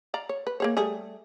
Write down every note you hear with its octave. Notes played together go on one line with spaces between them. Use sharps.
D5 F5 A#5
C#5
B4
A#3 G#4 C#5
G3 A3 G#4